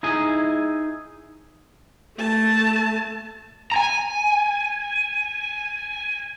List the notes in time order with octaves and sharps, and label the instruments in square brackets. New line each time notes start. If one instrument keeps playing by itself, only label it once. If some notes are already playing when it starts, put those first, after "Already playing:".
[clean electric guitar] D#4 E4 G#4 G#5
[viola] A3 A5
[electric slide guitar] G#5 A#5